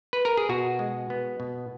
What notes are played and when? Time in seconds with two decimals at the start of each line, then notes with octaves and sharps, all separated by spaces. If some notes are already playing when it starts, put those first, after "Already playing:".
0.13 B4
0.25 A#4
0.37 G#4
0.49 B2 F#4
0.79 G#3
1.10 B3
1.40 B2